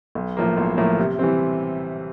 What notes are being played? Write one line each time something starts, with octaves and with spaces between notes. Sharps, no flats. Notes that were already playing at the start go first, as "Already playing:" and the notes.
B1
A2 F3 A#3
B1
A2 F3 A#3
C3
E3 G3 C4